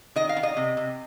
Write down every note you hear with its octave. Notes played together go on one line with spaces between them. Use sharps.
D#3 D#5
F5
D#3
D#5
C3
C3